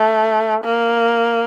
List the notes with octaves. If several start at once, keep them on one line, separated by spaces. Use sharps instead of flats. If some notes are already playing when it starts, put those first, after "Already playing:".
Already playing: A3
A#3